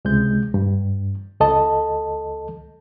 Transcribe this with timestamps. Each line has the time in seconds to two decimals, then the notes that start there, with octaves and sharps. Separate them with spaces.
0.05 C#2 C3 G#3 G6
0.54 G2
1.40 C#2 A4 D#5 A5